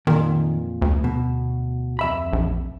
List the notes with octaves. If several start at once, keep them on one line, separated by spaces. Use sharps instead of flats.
F2 A#2 D#3
D2
B2
F2 E5 B5
A#1